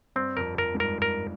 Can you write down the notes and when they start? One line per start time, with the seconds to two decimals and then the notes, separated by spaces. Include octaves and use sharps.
0.16 G2 C4
0.37 F2 A#4
0.58 F2 A#4
0.75 G#2
0.80 G2 A#4
1.02 A#4